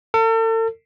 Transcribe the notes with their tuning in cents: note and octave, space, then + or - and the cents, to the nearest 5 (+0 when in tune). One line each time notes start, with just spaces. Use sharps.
A4 +40